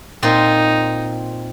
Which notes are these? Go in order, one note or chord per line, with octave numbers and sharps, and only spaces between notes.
A#2 C4 D#4 F4